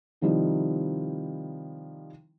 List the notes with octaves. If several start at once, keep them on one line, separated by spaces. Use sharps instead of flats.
C3 D#3 F3 G3 D#4 E4